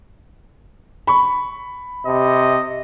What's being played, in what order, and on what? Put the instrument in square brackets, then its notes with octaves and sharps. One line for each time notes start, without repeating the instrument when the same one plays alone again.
[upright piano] B5 C#6
[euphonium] C3 [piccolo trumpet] D#5